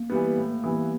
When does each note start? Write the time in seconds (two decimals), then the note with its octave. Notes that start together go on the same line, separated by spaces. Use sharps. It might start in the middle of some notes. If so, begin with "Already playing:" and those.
Already playing: A#3
0.10 E3 G3 B3
0.37 A2
0.64 E3 G3 B3